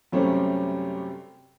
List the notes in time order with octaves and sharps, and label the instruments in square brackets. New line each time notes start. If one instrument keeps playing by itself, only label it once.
[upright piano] F#2 C3 G3 A3 C4 C#4